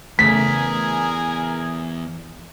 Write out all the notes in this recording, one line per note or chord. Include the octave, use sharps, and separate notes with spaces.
E2 C#3 A3 G#4 A#4 G#5 B6